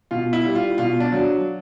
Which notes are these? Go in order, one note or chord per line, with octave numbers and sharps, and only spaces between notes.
B2 F4
E4
G3
F4
B2 F4
D4
F#3